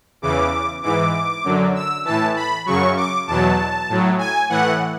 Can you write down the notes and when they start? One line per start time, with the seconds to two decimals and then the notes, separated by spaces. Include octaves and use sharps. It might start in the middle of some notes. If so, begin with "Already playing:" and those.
0.22 E2 C#3 E3 D6
0.83 G#2 E3 D6
1.44 F#2 D3 F#3
1.75 E6
2.05 A2 E3 A5
2.36 B5
2.66 F#2 C#3 F#3 C#6
2.97 D6
3.27 E2 B2 F#3 A5
3.89 A2 F#3
4.19 G#5
4.49 A2 E3 F#5